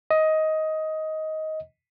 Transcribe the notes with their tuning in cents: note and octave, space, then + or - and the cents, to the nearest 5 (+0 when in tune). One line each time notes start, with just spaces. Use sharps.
D#5 +15